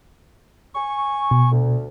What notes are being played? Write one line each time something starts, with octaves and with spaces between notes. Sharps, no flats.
G#5 C#6
B2
D2